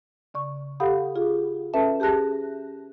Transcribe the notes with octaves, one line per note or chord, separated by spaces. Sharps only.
C#3 D5 C#6
G4 A4 F5 F#5 B5 D#6
F4 G#4
C#4 A4 B4 E5 A5
G4 G#4 A5 F#6 A#6